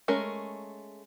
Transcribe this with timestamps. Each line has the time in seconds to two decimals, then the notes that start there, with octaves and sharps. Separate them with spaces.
0.08 G#3 A3 C#4 A#4